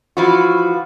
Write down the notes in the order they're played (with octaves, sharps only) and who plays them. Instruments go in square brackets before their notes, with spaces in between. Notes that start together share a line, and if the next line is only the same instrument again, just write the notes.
[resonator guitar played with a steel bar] E3 F3 F#4